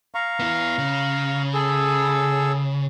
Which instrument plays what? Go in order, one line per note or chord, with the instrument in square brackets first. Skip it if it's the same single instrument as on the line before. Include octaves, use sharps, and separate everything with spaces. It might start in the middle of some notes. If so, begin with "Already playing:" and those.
[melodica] F5 A#5 C#6
[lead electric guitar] B3 E4
C#3
[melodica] G#4 A4 E6